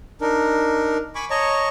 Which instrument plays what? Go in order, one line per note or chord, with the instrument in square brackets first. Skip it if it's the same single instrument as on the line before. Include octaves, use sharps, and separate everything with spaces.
[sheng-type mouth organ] D4 D#4 A#4
G#5 B5 C#6 D6
C#5 D#5 A5 A#5 C#6